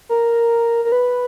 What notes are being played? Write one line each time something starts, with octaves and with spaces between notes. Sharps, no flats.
A#4
A#4
B4